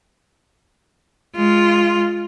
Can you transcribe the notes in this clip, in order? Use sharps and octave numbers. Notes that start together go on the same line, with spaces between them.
G#3 F4